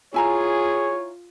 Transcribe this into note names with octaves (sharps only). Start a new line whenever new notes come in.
E4 F4 G#4 C#5 G#5 A#5